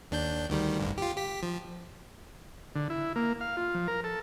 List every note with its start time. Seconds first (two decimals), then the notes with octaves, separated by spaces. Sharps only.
0.11 D#2 D4 G6
0.50 D2 D#3 G3
0.80 G#1 D2 G2
0.98 F4 G4
1.17 G4 B6
1.43 F3
2.75 D3
2.90 E4
3.16 A#3
3.41 F5
3.57 F4
3.75 F3
3.88 A#4
4.04 A4